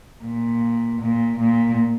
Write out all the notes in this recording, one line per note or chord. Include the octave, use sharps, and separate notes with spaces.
A#2
A#2
A#2